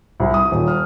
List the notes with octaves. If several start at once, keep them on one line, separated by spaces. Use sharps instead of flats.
C2
D#6
D#1
F6